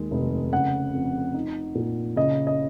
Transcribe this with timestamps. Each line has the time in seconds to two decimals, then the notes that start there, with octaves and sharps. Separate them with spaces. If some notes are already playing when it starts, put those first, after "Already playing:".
Already playing: D#2 G#3
0.11 F1
0.52 C#3 F#5
0.93 F2
1.34 D#4
1.75 A#2
2.16 C#3 D#5
2.47 D#5